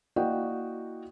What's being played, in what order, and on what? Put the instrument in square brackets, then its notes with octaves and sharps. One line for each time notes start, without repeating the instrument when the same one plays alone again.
[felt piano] A#3 E4 F#4 D5 D#5 G5